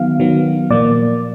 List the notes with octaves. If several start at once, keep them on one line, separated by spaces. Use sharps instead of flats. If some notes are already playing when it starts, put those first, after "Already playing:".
Already playing: D#3 F#3 B3 F5
D#3 F#3 B3
A#2 F3 A#3 D5